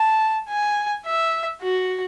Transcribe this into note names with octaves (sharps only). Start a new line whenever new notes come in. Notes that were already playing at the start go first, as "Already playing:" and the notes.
Already playing: A5
G#5
E5
F#4